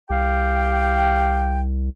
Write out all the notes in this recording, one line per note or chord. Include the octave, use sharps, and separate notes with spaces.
C2 G4 F5 G5